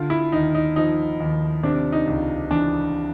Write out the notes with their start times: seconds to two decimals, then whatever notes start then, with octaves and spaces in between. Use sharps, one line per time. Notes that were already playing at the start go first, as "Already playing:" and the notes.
Already playing: D3 F4
0.10 E4
0.32 D#2 D#4
0.55 D#4
0.76 F3 D#4
1.20 D#2
1.63 C3 D4
1.92 D#4
2.07 C#2
2.50 E3 D4